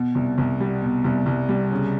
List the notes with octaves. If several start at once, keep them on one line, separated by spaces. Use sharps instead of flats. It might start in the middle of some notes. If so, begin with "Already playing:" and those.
Already playing: B2
C2
C2
G3
B2
C2
C2
G3
C#3